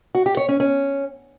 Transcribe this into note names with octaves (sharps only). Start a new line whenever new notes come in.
F#4
G4
C#5
C#4
C#4